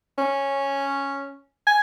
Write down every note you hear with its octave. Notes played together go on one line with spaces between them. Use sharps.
C#4
G#5